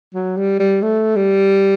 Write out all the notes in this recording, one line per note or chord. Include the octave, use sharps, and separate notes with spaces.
F#3
G3
G3
A3
G3